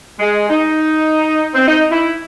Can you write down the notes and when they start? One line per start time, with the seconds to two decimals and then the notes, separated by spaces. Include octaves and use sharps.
0.20 G#3
0.49 D#4
1.55 C4
1.68 D#4
1.91 E4